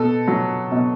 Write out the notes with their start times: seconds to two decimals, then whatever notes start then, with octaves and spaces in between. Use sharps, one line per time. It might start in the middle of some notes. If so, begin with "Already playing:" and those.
Already playing: B2 A4
0.28 F#3
0.72 B2